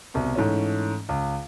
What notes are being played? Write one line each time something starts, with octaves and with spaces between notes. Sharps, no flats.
C2 B2
G#2 E3 A3 C#4
C#2